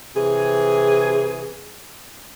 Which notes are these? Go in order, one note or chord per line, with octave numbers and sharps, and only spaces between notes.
C3 E3 G#4